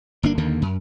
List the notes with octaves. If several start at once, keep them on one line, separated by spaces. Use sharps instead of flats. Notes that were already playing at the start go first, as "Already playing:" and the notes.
G1 A#3 D4
D#2 D3 D#3 A#3
F#2